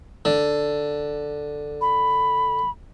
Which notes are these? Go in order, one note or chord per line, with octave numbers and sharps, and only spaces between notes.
D3
B5